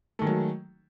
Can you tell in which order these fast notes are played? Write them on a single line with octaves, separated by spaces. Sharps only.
A3 D#3 G#3 F#3